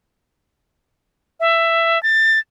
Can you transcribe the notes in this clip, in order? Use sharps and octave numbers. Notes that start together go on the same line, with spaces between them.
E5
A6